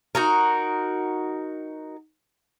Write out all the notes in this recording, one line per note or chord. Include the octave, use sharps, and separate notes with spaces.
D#4 F#4 A#4